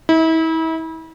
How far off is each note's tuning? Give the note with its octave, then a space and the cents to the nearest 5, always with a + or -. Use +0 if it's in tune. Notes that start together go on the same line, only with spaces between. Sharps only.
E4 -35